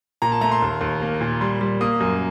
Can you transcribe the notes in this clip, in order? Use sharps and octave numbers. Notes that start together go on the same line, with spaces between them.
A#2 A#5
A5
A3 A#5
C6
D#2
D#2
A#3
A#2
G3 C6
G3
A#3 D#6
F#2